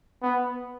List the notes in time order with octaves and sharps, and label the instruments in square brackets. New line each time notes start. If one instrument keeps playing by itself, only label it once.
[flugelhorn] B3